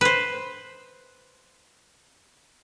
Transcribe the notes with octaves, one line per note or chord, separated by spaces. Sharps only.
B4 C5